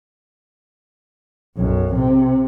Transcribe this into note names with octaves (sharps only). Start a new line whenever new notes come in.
B1 F#2
C3